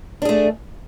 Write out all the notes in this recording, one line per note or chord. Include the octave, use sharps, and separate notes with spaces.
A3 D4 G#4